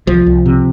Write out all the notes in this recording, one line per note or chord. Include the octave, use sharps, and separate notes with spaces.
C2 F3
C2
C3